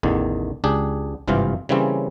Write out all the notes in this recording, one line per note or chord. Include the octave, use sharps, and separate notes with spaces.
A1 E2 D3 D#3
C#2 D4 G4 G#4
G#1 G2 C3 E3 F4 F5
C#3 E3 G3 A#3 C4 C#4